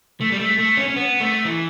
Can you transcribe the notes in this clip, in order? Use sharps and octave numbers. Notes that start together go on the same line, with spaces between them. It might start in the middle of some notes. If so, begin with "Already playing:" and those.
A3
G3
A3
A3
C#4
C#4
B3
A3
E3